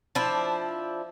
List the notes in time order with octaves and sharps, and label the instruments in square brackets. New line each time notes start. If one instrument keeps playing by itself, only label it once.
[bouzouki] F3 D4 E4